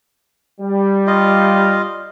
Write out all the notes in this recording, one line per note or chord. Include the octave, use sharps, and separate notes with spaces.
G3
F4 D#5 F5